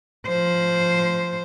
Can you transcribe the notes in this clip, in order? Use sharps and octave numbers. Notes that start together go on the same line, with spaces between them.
F3 C5